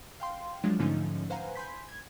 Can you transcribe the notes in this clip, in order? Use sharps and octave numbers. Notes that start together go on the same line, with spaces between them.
F5 G5 C6
F3 F#3 G#3 D4 F4
G#2 D3 F3 A3 C#4 D#4
B4 C5 F5 F#5 G#5 A#5
G#5 B5 C6 G6 B6
G#6